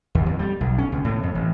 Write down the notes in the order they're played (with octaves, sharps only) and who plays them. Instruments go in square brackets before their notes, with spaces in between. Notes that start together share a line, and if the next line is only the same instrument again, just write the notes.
[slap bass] D#2
F2
G3
B1
C#4
C#2
A2
F2
A1